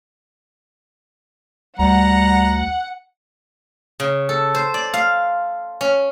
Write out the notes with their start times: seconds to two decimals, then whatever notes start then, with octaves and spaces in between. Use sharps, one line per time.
1.79 D2 G3 F#5 A#5
4.00 C#3
4.29 A4
4.55 C5
4.74 D5
4.94 F5
5.81 C#4